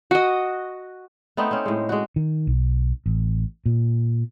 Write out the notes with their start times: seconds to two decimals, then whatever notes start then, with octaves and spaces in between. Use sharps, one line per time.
0.11 F#4 D#5
1.37 A3 B3 C4 D#4
1.51 C4 C#4
1.66 A2 G#3
1.89 G#3 F#4
2.16 D#3
2.47 B1
3.06 A1
3.66 A#2